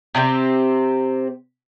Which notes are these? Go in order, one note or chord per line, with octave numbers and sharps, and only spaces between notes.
C3 C4 F4 G4